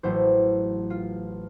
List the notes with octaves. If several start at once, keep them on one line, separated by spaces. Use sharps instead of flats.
A1 A2 F#3 A3 C5
F4